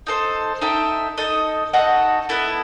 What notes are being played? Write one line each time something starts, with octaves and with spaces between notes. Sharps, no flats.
D#4 A4 C5
D#4 A4 E5 G5
D#4 A4 D#5
D#4 F#4 A4 D#5
B3 E4 A4